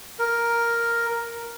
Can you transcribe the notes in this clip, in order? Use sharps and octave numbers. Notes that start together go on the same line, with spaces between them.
A#4